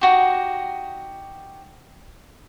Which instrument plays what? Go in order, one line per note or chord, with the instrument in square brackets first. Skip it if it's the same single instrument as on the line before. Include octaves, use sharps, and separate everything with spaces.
[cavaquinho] D#4 F#4 G4